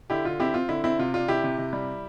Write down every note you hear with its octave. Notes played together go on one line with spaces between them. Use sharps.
D3 E4 G4
D3 F4
C4 E4 G4
C4 F4
D3 E4
C4 E4
C3 F4
D4 F4
C3 E4 G4
C3
C3
G3